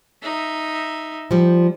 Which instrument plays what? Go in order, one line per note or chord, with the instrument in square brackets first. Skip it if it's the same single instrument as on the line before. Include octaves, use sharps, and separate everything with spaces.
[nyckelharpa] D#4 E5
[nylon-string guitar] F3 G3